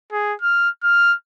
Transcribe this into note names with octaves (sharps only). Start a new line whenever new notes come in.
G#4
F6
F6